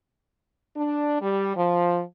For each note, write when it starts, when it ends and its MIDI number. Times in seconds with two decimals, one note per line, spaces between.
0.76 1.17 62
1.21 1.56 55
1.57 2.01 53